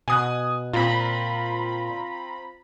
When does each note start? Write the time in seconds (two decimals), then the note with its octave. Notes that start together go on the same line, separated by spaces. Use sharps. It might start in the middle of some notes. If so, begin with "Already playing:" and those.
0.08 B2 G#5 D#6 F#6
0.73 A#2 C4 F4 A#5 B5